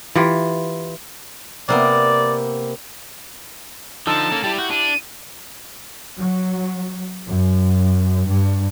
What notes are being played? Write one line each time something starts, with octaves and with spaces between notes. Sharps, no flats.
E3 F4 G4
C3 A#3 B3 D5
D3 F3 D#4 A5 E6
A#3 C#4 A4
G3 E4 G4
F#4 G6
D4 D#7
F#3
F#2
G2